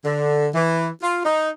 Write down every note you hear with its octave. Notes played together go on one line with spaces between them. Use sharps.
D3
E3
F4
D#4